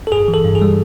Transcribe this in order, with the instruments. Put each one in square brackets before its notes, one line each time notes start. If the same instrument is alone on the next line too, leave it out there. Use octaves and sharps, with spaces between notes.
[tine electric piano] A4
G2 G#4
E3
A4
G2
G#4
G3